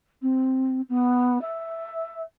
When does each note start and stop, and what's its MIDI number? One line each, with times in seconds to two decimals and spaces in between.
0.22 0.81 60
0.89 1.41 59
1.42 2.22 76